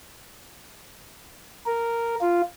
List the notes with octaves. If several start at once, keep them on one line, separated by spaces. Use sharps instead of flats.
A#4
F4